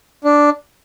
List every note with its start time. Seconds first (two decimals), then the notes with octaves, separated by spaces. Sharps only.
0.24 D4